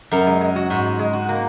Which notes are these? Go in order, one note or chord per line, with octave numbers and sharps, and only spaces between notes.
F#2 A#4
G#3
G#3
F#4
G#2 F#4
G#3
G#3
F#4
A#3